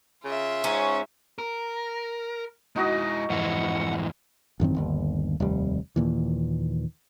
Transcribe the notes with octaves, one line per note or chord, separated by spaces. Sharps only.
C#3 F4 E5
G#2 C#4
A#4
G#3 D#4 E4 F#4 D#5
F2 G#2 E3 F#5
A1 F#2 D#3 C4
G1 D#2
F1 D#2 G3
D#2 A#2 E3